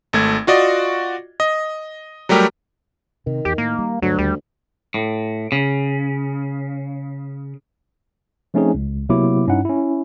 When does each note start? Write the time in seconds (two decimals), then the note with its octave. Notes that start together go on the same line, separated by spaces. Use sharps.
0.13 G#1 A3 G#6
0.47 F4 F#4 D5 D#5
1.40 D#5
2.29 F#3 G3 A3 G4 A#4
3.27 C3 D#3
3.45 E2 G4
3.58 A2 A#3
3.79 G3
4.02 D2 G2 F#3
4.19 D#2 G3
4.94 A2
5.52 C#3
8.54 F3 A3 C4 C#4 D#4 G#4
8.74 C#2
9.09 C3 F#3 A#3 B3 E4 D6
9.47 G2 C#4 D#4 E4 F#5
9.65 C#4 E4